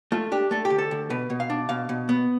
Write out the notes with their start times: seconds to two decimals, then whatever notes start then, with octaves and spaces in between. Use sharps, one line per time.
0.12 A3 F4
0.32 D4 G4
0.51 A3 A4
0.65 G4
0.70 D2
0.78 A4
0.91 D2
1.10 B2 B4
1.30 B2
1.40 F5
1.50 D4
1.69 B2 F5
1.89 B2
2.09 B3